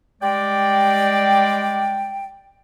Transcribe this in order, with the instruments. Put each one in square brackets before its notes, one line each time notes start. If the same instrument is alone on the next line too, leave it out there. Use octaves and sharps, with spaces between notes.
[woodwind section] G3 G#3 D5 G5